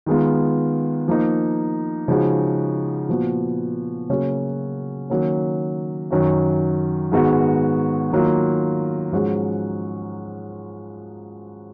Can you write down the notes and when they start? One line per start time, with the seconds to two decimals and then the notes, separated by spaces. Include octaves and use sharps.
0.06 D#3 G#3 B3 F4
1.08 F3 A#3 D#4
2.08 C#3 F3 G#3 D#4 F#4
3.09 A#2 F3 B3 F#4
4.09 C#3 F#3 A#3 C#4 F#4
5.10 D#3 F#3 A#3 C#4
6.11 F#2 D#3 F#3 C#4 F#4
7.12 G#2 D#3 G#3 B3 F#4
8.12 D#3 F#3 A#3 F4
9.12 G#2 F3 G#3 C#4 F#4